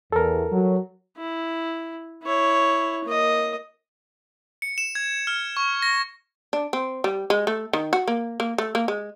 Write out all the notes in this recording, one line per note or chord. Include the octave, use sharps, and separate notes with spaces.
E2 A4 A#4
F#3
E4
E4 C#5
A#3 D#5
C#7
E7
G#6
F6
C#6
A#6
D4
C4
G3
G#3
A3
D#3
F#4
A#3
A#3
A3
A#3
G#3